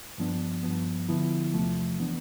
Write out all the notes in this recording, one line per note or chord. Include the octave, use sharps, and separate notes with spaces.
G2 F3 B3 D4
G2 F3 B3
D3 F3 B3 E4
E2 C3 F3 A3
E3 B3 D4